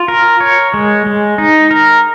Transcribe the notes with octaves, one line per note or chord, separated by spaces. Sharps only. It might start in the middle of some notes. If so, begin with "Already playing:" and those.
Already playing: F4
A#4
C#5
G#3
G#3
D#4
A#4